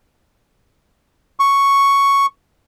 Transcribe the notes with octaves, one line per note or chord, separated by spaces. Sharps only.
C#6